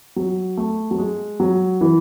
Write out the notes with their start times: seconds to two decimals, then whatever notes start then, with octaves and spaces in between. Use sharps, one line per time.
0.16 F#3
0.57 A3
0.91 F#3
0.98 G#3
1.40 F#3
1.81 E3